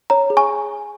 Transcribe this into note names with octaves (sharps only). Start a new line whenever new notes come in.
C#5 A#5
G#4
G#5 C#6